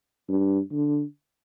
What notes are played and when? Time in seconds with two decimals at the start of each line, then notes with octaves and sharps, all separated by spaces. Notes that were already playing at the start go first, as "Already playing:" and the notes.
0.29 G2
0.72 D3